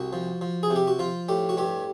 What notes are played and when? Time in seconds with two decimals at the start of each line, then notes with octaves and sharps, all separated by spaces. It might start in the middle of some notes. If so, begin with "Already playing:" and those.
Already playing: C2 F#4
0.13 F3
0.41 F3
0.63 G#4
0.70 C3
0.76 G4
0.87 F#4
0.99 F3 F4
1.29 A2 G4
1.49 F#4
1.57 G2 G4